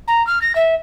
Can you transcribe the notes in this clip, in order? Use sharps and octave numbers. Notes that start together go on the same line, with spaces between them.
A#5
F6
A#6
E5